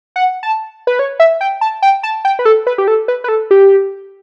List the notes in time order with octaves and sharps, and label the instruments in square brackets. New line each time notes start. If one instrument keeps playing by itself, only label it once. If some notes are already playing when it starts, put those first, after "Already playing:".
[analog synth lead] F#5
A5
B4
C#5
E5
G5
A5
G5
A5
G5
B4
A4
B4
G4
A4
B4
B4
A4
G4